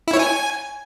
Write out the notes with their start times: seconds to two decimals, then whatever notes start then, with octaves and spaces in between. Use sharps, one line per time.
0.08 E4
0.13 C#5
0.19 G#5